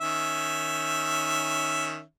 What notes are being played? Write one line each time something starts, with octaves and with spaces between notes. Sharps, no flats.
D#3 C#4 E5